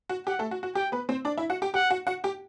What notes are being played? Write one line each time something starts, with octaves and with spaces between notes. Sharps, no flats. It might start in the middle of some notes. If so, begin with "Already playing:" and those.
F#4
G4 F#5
A3 A4
F#4
F#4
G4 G5
B3 B4
C4 C5
D4 D5
E4 E5
F#4 F#5
G4 G5
G4 F#5 G5
F#4 F#5
F#4 F#5
G4 G5